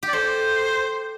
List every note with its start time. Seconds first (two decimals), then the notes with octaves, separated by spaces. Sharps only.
0.03 G4
0.08 D5
0.13 A4 C5